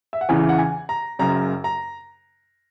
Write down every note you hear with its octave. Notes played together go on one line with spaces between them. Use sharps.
E5
F#5
E2 C#3 E3 G#5
F#5
G#5
A#5
F#1 F#2 C#3 A#5
A#5